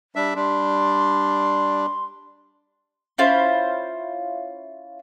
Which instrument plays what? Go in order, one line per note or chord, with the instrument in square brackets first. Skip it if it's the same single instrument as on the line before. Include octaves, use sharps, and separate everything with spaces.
[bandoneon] G3 D4 E5
[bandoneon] G3 D4 [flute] C6
[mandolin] C#4 E4 F4 C5